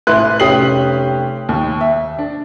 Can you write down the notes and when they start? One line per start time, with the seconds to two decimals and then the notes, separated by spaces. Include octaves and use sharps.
0.07 A1 E4 B4 C6 F#6
0.40 F1 C#4 G4 D#6 C7 F#7
1.49 D#2
1.81 E5
2.19 D4